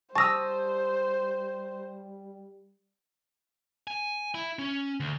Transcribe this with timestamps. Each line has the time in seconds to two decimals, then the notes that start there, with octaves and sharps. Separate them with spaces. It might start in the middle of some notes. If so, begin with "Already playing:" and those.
0.15 G3 C5 A5 C#6 D#6 E6 A#6
3.87 G#5
4.34 E4
4.59 C#4
5.00 D2